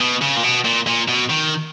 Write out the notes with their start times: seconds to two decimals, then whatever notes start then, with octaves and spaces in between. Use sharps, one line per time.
0.01 B2
0.22 C#3
0.37 A#2
0.44 B2
0.65 A#2
0.87 A#2
1.08 B2
1.30 D#3